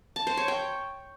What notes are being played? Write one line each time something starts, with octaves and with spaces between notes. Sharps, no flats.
A5
C5
C#5
G5